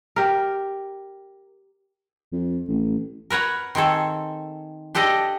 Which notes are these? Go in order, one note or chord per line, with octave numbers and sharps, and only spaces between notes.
G4 A#4
F2
A1
A#4 B4 C#5 F#5
D#3 C4 G#4 A4
D4 G4 A4 D5 D#5